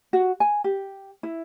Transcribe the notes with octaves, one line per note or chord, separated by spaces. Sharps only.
F#4
G#5
G4
E4